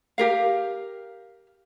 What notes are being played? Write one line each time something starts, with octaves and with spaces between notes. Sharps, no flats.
G4 A#4 F5